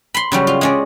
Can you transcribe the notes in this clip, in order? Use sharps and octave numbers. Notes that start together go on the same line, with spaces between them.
B5 C6
C#3 F#3 G3
F4
G#3 C#4 D5